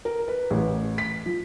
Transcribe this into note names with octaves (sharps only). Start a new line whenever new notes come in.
A#4
B4
A1
B6
F3